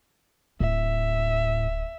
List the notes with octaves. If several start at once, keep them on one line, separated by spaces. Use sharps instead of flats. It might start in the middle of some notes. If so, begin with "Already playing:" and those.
D1 A2 E5